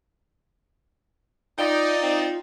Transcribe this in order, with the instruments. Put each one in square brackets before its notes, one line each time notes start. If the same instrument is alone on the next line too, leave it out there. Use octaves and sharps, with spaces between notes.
[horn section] D#4 [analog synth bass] F4 [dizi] D5 [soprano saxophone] G5
[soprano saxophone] C4